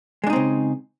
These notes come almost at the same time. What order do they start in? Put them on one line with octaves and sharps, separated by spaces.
G#3 D4 D#4 C4 C#3